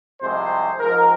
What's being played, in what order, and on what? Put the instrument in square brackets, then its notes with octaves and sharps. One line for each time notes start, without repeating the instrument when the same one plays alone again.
[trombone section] C2 C3 F3 G#3 C5
G#2 F3 G#3 A#4